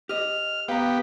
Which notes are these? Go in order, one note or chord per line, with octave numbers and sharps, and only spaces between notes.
G4 D#5 F6
B3 G4 F5 A#5